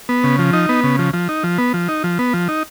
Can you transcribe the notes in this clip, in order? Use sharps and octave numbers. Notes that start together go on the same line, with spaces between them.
B3
C#3
F3
D#4
B3
C#3
F3
F3
D#4
F3
B3
F3
D#4
F3
B3
F3
D#4